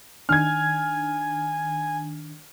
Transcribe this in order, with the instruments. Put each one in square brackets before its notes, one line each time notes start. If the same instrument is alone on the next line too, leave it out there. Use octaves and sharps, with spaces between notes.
[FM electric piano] D#3 D4 [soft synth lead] G#5 [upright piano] F6 G#6